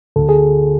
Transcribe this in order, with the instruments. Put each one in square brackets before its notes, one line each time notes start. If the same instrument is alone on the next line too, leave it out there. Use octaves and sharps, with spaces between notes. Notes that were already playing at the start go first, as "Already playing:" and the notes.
[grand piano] D2 [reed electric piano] A4
[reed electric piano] G#4